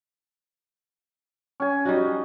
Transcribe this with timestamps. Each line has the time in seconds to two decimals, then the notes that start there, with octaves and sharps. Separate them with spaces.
1.60 C#4 G#5
1.85 G3 D#4 F#4